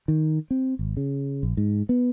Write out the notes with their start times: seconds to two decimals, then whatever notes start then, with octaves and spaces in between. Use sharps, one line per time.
0.08 D#3
0.51 C4
0.79 G#1
0.97 C#3
1.43 A#1
1.57 G#2
1.89 B3